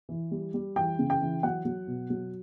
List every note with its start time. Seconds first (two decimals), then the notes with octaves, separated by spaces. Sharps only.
0.09 E3
0.31 G3
0.54 G3
0.76 E3 G5
0.99 C#3
1.10 G5
1.21 E3
1.43 F#3 F#5
1.65 F#3
1.87 B2
2.10 F#3